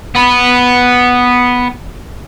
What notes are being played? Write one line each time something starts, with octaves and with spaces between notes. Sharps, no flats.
B3 B5